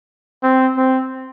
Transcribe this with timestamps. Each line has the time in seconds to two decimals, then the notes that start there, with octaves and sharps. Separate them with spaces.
0.43 C4
0.77 C4